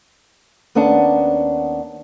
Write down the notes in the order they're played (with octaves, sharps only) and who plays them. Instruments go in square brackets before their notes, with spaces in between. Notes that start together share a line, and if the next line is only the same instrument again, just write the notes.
[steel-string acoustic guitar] D#2 B3 C#4 D4 F#5 A5